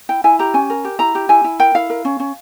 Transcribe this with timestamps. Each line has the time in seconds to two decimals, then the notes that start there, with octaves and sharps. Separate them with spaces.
0.09 E4 G5
0.24 E4 G#5
0.39 G4 A#5
0.54 C#4 G#5
0.70 A#4
0.85 G4
0.99 E4 A#5
1.15 G4
1.29 E4 G#5
1.44 E4
1.60 A#4 G5
1.75 E4 F5
1.90 A#4
2.05 C#4
2.20 C#4